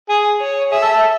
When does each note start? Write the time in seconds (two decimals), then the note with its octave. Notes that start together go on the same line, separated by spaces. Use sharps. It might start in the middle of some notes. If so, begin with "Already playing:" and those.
0.09 G#4
0.40 C#5
0.72 G#4 E5
0.82 A4
0.93 A4